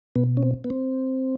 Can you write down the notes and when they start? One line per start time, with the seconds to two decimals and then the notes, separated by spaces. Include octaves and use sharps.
0.15 B2 B3
0.37 C#4
0.43 C4
0.64 B3
0.70 C4